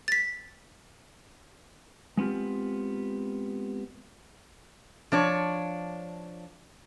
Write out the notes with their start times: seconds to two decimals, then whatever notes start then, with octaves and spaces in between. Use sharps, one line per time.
0.08 A6 B6
2.17 G#3 B3 C4 F4 G4
5.12 F3 D4 C#5